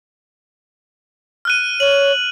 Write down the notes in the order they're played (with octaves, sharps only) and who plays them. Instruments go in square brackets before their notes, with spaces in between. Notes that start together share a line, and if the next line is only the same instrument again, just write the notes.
[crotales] F6 F#6 D#7
[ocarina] C#5 [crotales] F#7